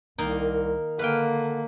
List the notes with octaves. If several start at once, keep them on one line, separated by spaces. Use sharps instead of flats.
C2 D#3 A#3 D#4
D3 A#3 B4 F5 G5